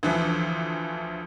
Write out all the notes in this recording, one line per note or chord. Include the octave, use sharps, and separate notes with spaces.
D2 E3 F3